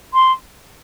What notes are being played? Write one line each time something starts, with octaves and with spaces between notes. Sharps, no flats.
C6